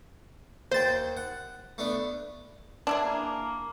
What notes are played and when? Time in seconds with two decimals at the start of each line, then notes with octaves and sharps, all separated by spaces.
0.72 D#2 C5 G5 A6
1.17 F#5
1.78 A3 B3 D4
2.87 D4 E4 G#4
3.05 A#3